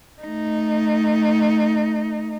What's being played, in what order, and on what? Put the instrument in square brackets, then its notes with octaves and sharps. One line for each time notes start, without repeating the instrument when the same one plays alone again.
[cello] A3 D#4